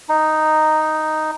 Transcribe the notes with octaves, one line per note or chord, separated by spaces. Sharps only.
D#4